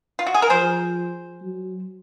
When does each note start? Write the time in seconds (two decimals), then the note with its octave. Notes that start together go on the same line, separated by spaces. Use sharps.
0.19 F4
0.27 F#4
0.34 G#4
0.42 A#4
0.50 F3 G#4 C5
1.42 F#3